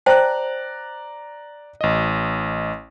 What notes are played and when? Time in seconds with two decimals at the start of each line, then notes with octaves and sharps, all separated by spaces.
0.06 C5 D5 G5 A5 A#5 F#6
1.81 A1 D#5